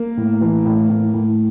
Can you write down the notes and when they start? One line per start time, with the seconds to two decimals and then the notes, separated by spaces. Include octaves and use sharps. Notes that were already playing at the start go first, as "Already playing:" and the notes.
Already playing: A#3
0.17 A2
0.41 E3
0.66 A2
0.90 A2
1.14 A2